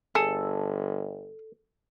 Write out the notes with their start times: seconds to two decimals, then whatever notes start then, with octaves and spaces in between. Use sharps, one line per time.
0.15 G1 G#4 A4